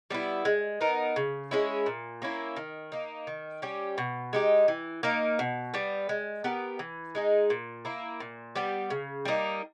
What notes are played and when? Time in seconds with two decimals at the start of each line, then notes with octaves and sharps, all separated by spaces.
0.10 G3 B3 E4
0.45 G#3
0.81 B3 D#4 A#4
1.16 C#3
1.51 G#3 C#4 E4
1.86 A#2
2.22 A#3 C#4 E4
2.56 D#3
2.92 A#3 D#4
3.27 D#3
3.62 G3 C#4 G4
3.98 B2
4.33 G#3 D#4 G4
4.68 E3
5.03 A#3 D#4 A#4
5.39 B2
5.74 G3 B3
6.09 G#3
6.44 B3 G4 A#4
6.79 E3
7.15 G#3 D#4 G#4
7.50 A#2
7.85 A#3 E4
8.20 A#2
8.55 G3 B3 G4
8.90 C#3
9.25 G3 A#3 D#4